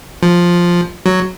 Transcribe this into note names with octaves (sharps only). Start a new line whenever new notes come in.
F3
F#3